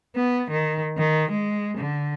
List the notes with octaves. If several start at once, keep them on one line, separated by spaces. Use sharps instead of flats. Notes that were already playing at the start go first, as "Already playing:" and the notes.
B3
D#3
D#3
G#3
D3